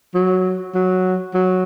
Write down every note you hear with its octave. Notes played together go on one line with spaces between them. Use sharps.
F#3
F#3
F#3